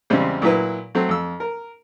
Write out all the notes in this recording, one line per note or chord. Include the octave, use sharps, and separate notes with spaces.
E2 C#3 G3 G#3 C4
A#2 F#3 E4 B4
F#3 A3 C4
F2 E6
A#4